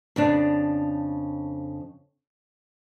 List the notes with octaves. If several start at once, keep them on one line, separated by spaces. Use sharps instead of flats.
F2 C#3 D4